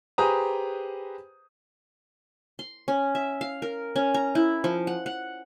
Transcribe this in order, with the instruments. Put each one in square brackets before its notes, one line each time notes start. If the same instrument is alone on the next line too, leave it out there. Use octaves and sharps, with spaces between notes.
[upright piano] G4 G#4 B4 C5 A#5 D#6
[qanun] C6
C#4
E5
F5
A#4
C#4
A#5
E4
F3
F#5
F#5